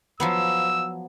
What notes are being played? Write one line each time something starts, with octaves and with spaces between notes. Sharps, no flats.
F3 F#3 B3 E6